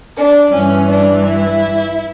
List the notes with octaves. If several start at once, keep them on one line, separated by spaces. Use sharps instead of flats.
D4
G2 E3 C#4
D4
E4